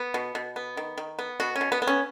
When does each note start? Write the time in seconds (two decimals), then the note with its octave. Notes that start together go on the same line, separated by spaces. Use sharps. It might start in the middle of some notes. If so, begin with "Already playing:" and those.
Already playing: B3
0.14 B2
0.35 B2
0.56 B3
0.77 D#3
0.98 D#3
1.19 B3
1.40 B2 F#4
1.56 C#4
1.61 B2
1.72 B3
1.82 B3
1.87 C#4